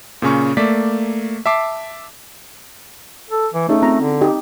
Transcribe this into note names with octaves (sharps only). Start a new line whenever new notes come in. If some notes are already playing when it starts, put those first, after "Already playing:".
A#2 C#3 C#4 C#6
A3 A#3 D5 E5 B6
E5 A5 D6 C7
A4
E3
A3 C#4 D#4 G#4
C4 F4 A#5
D3
D#4 G4 D#5